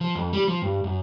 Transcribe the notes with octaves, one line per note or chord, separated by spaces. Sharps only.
F3
F2
G3
F3
G2
F#2